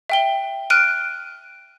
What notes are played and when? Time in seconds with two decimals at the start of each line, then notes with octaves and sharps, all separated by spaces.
0.10 E5 G5 G7
0.70 F6 F#6 D7 D#7